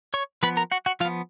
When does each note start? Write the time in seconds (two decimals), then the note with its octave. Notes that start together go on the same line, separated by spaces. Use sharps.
0.14 C#5 C#6
0.43 F3 B3 B4 B5
0.57 A#4 A#5
0.72 F#4 F#5
0.86 F#4 F#5
1.00 F3 F4 F5
1.05 B3